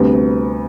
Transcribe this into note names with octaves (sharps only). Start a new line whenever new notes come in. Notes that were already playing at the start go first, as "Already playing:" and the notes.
Already playing: D2 C3 G3 B3